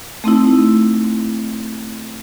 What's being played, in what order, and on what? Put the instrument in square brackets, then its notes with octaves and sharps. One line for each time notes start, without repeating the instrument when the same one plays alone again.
[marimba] A3 C4 D#4 E4